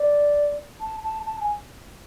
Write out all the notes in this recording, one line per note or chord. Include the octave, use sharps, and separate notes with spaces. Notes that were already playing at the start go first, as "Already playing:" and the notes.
Already playing: D5
A5
A5
A5
G#5